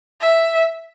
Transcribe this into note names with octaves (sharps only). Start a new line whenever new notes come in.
E5